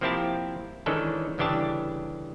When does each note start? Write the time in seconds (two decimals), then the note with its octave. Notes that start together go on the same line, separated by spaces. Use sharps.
0.01 F3 A#3 C4 E4 G4 A5
0.86 D#3 E3 G#3 C#4 D4 A4
1.38 G1 C#3 E3 D4 G4 A5